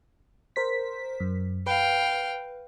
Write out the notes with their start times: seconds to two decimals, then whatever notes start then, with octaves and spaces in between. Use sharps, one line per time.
0.56 A#4 C5 B6
1.20 F#2
1.66 B4 F5 G5